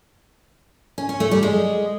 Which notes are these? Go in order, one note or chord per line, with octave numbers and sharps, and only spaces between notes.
C#4
C#4
A3
G3
G#3